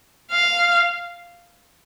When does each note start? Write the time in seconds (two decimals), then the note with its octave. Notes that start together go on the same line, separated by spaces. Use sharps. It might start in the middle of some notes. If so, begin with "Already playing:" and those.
0.31 F5